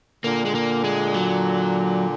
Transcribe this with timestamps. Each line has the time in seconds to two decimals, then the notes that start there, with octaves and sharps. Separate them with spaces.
0.24 A#2 D3 A#3
0.45 G#3
0.55 A#3
0.84 G#3
1.14 F#3